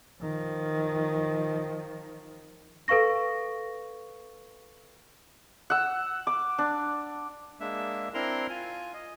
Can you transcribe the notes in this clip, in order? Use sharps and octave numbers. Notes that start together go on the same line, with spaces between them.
D#3 F3
A4 B4 F5 C#6 A#6
F#5 E6
D6
D4
G#3 A#3 D4 E5
C4 D4 E4 A#4 A#5 C6
F4 G#5
D#5